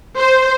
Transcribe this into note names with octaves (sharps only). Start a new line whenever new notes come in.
C5